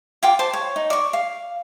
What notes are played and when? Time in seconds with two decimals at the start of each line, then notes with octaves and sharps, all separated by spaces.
0.23 F4 G5 D6
0.39 C5 A5 D6
0.53 C#5
0.76 D#4
0.90 D5 C#6
1.13 F5